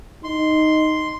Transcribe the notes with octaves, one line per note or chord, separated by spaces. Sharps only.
D#4 C6